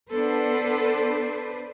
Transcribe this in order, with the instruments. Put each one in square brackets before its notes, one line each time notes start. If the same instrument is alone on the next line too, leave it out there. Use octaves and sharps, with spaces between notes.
[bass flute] B3 [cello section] D4 B4 C5 [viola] A4